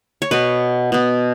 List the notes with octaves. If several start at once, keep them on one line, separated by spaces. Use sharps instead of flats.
C#5
B2 B3 B4
B2 B3